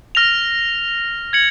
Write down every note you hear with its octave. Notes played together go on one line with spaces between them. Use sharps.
F6 A#6 F7
G#6 C#7 F#7